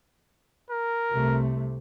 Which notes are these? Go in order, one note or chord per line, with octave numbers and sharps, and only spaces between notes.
A#4
C2 C3 A3